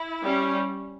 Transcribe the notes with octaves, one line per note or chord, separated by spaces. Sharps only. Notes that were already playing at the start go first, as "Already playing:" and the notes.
Already playing: E4
G3 C#4